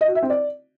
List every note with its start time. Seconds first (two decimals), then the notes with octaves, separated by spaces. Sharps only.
0.01 D#5
0.08 F#4
0.15 E5
0.22 C4
0.30 D5